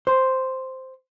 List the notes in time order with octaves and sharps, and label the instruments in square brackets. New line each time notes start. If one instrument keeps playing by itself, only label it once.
[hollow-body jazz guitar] C5